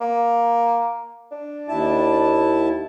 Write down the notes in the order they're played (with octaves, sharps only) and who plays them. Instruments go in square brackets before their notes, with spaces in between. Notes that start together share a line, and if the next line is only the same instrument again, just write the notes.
[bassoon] A#3
D4
[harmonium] D#2 E4 A5